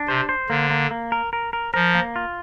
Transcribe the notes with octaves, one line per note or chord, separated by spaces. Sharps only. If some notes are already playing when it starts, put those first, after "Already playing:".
Already playing: D4
C3 C5
C5
D3 A#3
A#3
A#3
A#4
A#4
A#4
F3 A#4
A#3
F4